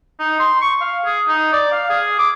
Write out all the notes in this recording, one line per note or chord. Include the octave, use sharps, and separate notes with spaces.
D#4
C6
C#6
F5
G#4
D#4
D5
F5
G#4
D6